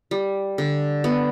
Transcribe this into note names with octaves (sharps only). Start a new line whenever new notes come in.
G3
D3
B3